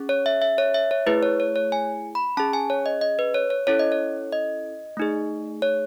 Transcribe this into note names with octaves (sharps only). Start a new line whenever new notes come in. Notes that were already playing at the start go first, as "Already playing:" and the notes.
Already playing: C#4 G#4
C#5
E5
E5
C#5
E5
C#5
A3 E4 G#4 B4
C#5
C#5
C#5
G#5
B5
C#4 G#4 A5
G#5
C#5
D#5
D#5
B4
C#5
C#5
C#4 E4 A4 C#5
D#5
C#5
D#5
A3 D#4 G#4
C#5